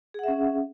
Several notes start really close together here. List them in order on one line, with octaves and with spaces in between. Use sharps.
G#4 F#5 E5 C#4